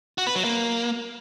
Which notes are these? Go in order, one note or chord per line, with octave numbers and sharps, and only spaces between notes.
F#4
B4
F#3
A#3